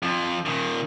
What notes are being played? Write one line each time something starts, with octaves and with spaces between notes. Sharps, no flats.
F2 F3
A#2 D#3